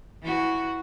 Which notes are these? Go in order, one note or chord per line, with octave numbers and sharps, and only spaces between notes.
E3 F#4